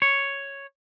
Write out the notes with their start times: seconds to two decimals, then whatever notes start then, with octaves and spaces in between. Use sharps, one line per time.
0.02 C#5